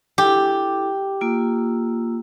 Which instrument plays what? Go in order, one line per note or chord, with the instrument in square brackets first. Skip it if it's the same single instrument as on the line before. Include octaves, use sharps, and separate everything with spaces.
[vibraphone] E4 A4 [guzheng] G4
[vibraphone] A#3 F4 E6